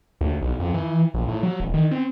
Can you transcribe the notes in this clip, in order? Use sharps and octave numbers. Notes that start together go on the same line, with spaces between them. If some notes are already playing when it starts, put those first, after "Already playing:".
D2
B1
F2
E3
A#1
A2
F#3
D#1
D#3
C4